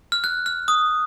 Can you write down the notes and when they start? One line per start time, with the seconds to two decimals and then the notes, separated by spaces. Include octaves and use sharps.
0.12 F6
0.24 F#6
0.46 F6
0.68 D#6